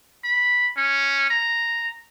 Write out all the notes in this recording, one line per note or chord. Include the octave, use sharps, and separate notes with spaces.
B5
C#4
A#5